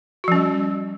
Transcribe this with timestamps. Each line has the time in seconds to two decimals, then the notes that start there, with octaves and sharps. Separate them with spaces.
0.24 F#4
0.28 F3
0.32 C#4
0.36 G3